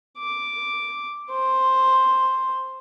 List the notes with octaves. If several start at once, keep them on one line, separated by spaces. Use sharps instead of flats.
D6
C5